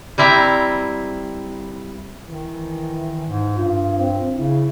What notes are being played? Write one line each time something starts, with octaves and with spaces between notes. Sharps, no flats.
G3 C4 E4 A#5
D#3 E3
G#2
G2 F4
C4
C#3 E4